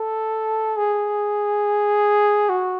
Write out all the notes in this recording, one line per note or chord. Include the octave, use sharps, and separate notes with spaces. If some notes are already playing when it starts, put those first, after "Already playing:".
Already playing: A4
G#4
F#4